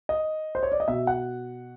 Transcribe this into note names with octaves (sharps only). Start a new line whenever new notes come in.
D#5
C5
C#5
D5
D#5
B2 E5
F#5